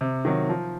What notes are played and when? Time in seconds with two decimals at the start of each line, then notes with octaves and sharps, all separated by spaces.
0.01 C3
0.25 D#3 F#3
0.49 F3